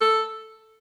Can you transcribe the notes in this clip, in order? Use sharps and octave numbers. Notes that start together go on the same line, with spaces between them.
A4